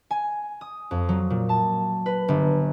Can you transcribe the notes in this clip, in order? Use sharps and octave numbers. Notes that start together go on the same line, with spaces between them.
G#5
D#6
F2
F#3
A#2
A5
B4
G1